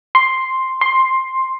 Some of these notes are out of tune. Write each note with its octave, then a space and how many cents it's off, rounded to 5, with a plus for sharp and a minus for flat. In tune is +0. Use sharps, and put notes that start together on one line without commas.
C6 +5
C6 +10